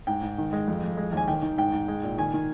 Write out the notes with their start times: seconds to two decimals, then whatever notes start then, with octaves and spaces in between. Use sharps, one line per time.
0.07 G#2 G5
0.23 G#2
0.38 D#3
0.53 G#3
0.68 F2
0.83 F2
0.97 G#3
1.13 D#2 G#5
1.28 D#3 G5
1.42 D#3
1.58 G#2 G5
1.73 G#2
1.88 G#3
2.03 A#2
2.18 D#3 G#5
2.34 D#3